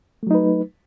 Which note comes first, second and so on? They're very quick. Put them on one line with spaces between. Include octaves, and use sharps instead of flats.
A3 F#3 D#4 B4